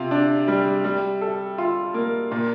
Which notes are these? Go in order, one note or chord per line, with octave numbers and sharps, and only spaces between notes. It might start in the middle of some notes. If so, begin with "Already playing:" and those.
Already playing: C3 F4
D4
G3
G3
A4
F4
A#3
A#2